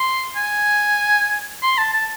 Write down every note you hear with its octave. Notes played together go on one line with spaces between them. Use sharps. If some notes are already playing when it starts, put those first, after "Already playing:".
Already playing: C6
G#5
C6
A5
A5